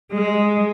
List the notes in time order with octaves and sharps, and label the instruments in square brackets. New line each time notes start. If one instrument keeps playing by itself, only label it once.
[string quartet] G#3